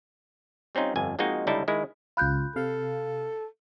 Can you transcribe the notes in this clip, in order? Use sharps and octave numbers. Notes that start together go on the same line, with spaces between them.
G3 C4 C#4 D#4 F4
G1 F2 G#5
F3 G#3 A#3 C4 D#4 F#4
C#2 D3 G3 D#4 E4 A5
D#3 G#3 E4
C#2 F4 B5 F#6 G6
C3 A4 F5